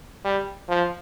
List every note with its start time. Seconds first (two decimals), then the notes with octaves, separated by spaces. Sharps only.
0.24 G3
0.68 F3